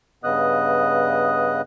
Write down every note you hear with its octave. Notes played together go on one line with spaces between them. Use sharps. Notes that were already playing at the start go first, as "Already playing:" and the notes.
G2 C#3 B3 D#5 D#6 F#6